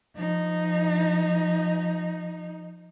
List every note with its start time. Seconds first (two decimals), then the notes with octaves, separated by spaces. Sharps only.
0.15 F3 D#4